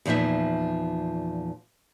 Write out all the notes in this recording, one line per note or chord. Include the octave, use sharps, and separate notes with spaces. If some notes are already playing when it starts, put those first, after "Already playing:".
E2 A#2 F3 D#4 E5